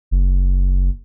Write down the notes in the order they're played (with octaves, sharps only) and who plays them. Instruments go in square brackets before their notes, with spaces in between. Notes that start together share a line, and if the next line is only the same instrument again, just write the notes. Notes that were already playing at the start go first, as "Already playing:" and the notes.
[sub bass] F#1